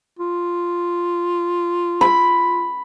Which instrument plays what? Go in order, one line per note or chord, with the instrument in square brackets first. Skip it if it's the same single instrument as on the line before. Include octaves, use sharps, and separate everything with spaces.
[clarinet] F4
[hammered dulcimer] B5